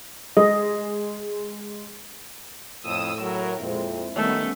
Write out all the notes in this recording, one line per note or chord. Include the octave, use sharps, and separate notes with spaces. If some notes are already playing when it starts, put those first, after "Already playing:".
G#3 D#5
F2 A2 D#6 E6
F#3 A#4
F2 A#2 G#3 C4 E4
D2 D#3 G3 A3 B3 C#4